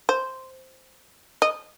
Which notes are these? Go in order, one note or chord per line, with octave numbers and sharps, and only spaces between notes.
C5
D#5